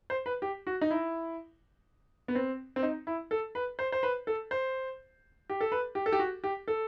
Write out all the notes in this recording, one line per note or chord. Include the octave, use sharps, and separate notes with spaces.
C5
B4
G4
F#4
D#4
E4
B3
C4
C4
D#4
E4
A4
B4
C5
C5
B4
A4
C5
G4
A4
B4
G4
A4
G4
F#4
G4
A4